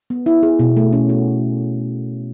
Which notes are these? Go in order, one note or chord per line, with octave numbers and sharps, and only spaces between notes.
B3
E4
G#4
B2
A3
C#4
F#4